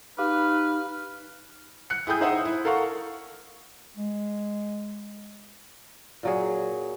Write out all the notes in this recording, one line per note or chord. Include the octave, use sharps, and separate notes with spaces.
D#4 G4 B4 F5 D6 F6
F#6 C#7
E4 G#4 G5 D#6 G6
D#4 C5 E5 F#5 D#6
E4
A4 A#4 F5 F#5 C#6
G#3
A#2 F#3 G#4